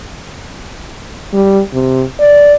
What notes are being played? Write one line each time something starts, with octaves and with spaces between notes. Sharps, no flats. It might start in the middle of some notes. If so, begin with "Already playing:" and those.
G3
C3
D5